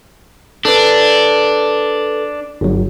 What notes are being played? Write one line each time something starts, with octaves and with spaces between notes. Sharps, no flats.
D4 A4 B4
G1 F#3